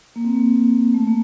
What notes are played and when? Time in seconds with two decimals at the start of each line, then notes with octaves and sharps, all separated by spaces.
0.16 A#3
0.25 C4
0.34 A#3
0.94 A3
1.07 A#3